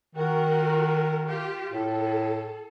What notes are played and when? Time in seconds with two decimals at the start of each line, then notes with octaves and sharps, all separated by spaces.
0.15 D#3 F#4 A#4
1.25 F4 G4
1.72 A2 A4